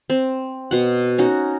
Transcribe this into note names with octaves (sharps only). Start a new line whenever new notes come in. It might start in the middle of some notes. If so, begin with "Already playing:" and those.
C4
B2 F#5
C#4 D#4 F#4